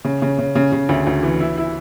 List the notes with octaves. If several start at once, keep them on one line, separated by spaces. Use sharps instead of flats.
C#3
C#3
C#3
C#3
C#3
D2
D2
E3
E4
E4